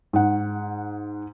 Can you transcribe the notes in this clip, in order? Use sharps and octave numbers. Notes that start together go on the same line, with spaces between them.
G#2 F#5